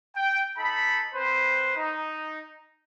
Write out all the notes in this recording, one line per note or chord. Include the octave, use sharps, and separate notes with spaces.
G5
D#4 A4 B5
C4 B4 C5
D#4